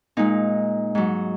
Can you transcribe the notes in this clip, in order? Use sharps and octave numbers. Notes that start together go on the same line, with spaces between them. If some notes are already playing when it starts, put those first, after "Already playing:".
A#2 G#3 D#4
G#2 F#3